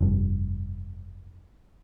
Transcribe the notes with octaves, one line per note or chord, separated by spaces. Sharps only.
F1 G2